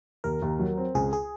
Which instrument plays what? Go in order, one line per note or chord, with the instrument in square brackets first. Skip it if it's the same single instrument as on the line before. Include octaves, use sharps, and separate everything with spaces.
[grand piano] D#2 [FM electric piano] A#4
[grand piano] D#2
F#3
C4
[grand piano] C#2 [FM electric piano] G#4
[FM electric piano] G#4